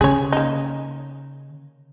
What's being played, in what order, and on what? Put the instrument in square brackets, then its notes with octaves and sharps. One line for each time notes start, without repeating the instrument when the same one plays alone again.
[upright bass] C#3 [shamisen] G#4 C#5
[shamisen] A#3 D#4